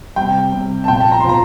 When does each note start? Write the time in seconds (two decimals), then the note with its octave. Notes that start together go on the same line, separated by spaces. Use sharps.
0.16 C3 G3 G5
0.53 C3 G3
0.84 A5
0.88 A#2 F3 G5
1.00 A5
1.12 A#5
1.20 C6
1.24 A#2 F3 A#5